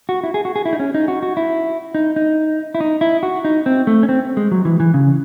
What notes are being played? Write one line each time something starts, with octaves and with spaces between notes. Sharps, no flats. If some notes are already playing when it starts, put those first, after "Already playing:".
F#4
E4
G#4
F#4
G#4
E4
D#4
C#4
D#4
F#4
F#4
E4
D#4
D#4
E4
D#4
E4
F#4
D#4
C4
A3
C#4
C4
G#3
F#3
E3
E3
C#3